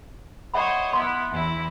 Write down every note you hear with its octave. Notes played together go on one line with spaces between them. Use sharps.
C5 C#5 D#5 E5 F#5 B5
B3 E4 C6
E2 E4